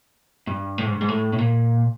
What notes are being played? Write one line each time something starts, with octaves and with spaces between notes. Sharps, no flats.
G2
A2
G#2
G2
G#2
A2
A2
A#2